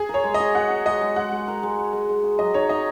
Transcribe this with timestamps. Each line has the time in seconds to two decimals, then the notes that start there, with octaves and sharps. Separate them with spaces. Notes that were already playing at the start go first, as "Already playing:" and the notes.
Already playing: G#4
0.09 A#4
0.14 C#5
0.24 G#3
0.34 D#5
0.40 F#4
0.55 F#4 F#5
0.70 F#4
0.86 G#3 D#5
1.01 G#3
1.16 G#3 F#5
1.32 G#3
1.48 A#4
1.63 G#3
1.78 F#4
1.93 G#3
2.09 G#3
2.24 F#4
2.39 F#3 D#5
2.54 D#4 C#5
2.69 D#4 D#5